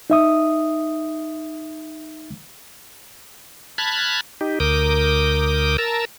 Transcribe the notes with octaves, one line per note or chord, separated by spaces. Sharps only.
D#4 E5 D#6
A5 B5 F6 F#6 G#6
D#4 G4
D2 A#4 D6 D#6 G6
A#4 A5 A#5 E6